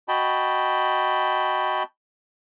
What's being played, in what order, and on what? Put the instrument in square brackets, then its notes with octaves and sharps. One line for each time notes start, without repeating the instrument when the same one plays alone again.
[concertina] F#4 D#5 G5 A5 B5